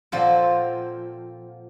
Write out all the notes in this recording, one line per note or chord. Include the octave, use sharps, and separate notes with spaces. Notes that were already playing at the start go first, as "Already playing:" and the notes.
A#2 F3 C4 F4 F#4 A4